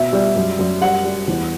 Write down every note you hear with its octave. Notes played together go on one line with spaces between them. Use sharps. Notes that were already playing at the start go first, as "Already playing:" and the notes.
Already playing: B2 E5
G3
F#2
F#2
G3 F#5
G3
E2